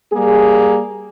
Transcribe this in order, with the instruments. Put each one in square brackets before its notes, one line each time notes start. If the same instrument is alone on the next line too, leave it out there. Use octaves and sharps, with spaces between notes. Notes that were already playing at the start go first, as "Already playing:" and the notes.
[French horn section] G3 A#3 G#4